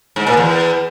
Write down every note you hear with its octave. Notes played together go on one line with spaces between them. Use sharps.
G#2
A#2
E2